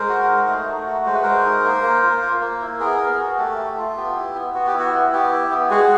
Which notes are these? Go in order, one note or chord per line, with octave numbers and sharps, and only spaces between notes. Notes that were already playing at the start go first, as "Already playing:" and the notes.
Already playing: G#3 A#4 C5
F#4
D#4
A3
A3
F#4
G#3 C5
B4
G#3 A#4 C5
D#4
A#3
A#3
F4
A#3
A#3
E4
B3 G#4 A#4
B3
F#4
A3 G4 A4
A3
F4
B3 G4
E4
B3
B3 F#4
G4
E4
F#4
B3
B3 G4
E4
B3
G#3 F#4 G#4